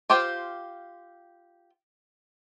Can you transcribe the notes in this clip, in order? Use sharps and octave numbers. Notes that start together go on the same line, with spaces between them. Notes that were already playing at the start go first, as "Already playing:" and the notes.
F4 G4 C5 G5